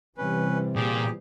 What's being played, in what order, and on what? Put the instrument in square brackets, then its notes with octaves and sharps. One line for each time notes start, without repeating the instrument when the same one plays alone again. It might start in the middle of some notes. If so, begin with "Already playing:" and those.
[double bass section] C3 E3 G3 [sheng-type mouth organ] C#4 B4
[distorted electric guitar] A#2 [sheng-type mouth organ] G4 G#4